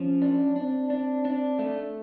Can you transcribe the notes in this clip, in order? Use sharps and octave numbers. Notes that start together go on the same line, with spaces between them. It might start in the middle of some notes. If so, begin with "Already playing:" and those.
Already playing: F3 C#4
D4
C4 D4
D4
D4
A3